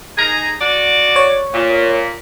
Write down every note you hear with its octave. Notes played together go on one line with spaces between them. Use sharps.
D#4 G#4 A#5
F#4 D5
C#5
A#2